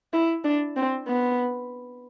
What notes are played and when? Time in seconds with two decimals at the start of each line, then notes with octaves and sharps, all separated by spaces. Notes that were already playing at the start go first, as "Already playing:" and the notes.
0.13 E4
0.44 D4
0.76 C4
1.08 B3